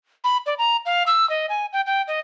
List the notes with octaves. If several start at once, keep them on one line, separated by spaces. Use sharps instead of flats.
B5
D5
A#5
F5
E6
D#5
G#5
G5
G5
D#5